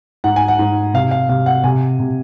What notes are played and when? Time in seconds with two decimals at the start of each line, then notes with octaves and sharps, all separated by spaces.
0.24 G#2 F#5
0.36 G#5
0.48 F#5
0.59 G#2
0.94 C3 F5
1.11 F5
1.29 C3 F5
1.46 F#5
1.64 C3 G#5
1.99 C3